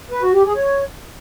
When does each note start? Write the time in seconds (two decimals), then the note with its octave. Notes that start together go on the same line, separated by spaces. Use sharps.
0.11 B4
0.22 F#4
0.34 G4
0.45 G#4
0.56 C#5